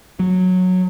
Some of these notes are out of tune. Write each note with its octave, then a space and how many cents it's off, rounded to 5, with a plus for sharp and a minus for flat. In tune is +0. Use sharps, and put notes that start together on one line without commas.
F#3 -10